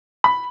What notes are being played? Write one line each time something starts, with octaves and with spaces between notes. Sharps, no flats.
B5